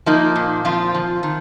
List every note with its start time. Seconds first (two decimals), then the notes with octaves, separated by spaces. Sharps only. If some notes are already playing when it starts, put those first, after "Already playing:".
0.06 F3 A#3 D#4
0.36 A#2
0.65 F3 C4 F4
0.94 F3
1.23 D#3